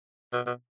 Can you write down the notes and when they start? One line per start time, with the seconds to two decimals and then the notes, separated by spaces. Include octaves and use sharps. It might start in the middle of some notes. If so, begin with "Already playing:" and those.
0.33 B2
0.46 B2